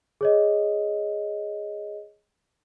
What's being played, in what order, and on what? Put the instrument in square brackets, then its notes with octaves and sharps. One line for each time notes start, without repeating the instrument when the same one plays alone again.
[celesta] G#4 C#5 D#5